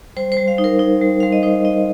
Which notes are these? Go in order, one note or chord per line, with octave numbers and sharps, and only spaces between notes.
G3 C5
C5
G3
F5
D#4
A#4
D#4
G3
G3 F5
D#5
D#4 C5
D#4 D#5